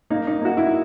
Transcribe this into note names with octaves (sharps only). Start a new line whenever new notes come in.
A#3 D#4
D#4
A#3 F#4
E4